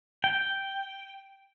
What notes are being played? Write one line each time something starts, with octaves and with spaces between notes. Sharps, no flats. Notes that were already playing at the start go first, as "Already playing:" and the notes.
G5